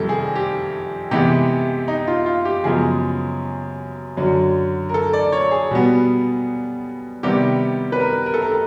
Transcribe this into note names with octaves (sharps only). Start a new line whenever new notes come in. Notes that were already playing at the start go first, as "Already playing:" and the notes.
Already playing: F2 C3 D#3 G3 A4
G#4
G4
C3 E3 G#3 B3 G4
D#4
F4
F4
G4
F#2 C#3 F3 G#3 B3 G#4
F#2 D3 F#3
A#4
A4
D5
C#5
G#4
B2 G3 B3
C3 D#3 G3 B3 G4
B4
A#4
A#4
A4
A#4
A4